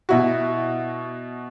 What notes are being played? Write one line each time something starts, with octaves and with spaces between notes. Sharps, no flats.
B2 E4 F#4